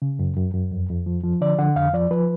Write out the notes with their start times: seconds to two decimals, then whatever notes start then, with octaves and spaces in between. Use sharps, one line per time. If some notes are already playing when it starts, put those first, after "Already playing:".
0.02 C#3
0.19 F#2
0.37 F#2
0.54 F#2
0.71 F2
0.89 F2
1.06 F3
1.24 F3
1.41 D3 D5
1.59 D3 F#5
1.76 F2 F5
1.93 F3 D5
2.11 F3 B4